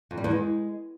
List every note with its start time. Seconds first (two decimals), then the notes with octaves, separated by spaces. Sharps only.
0.11 F2
0.17 G3
0.24 E2
0.31 G#3